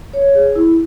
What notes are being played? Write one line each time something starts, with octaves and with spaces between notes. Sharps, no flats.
C#5
G#4
E4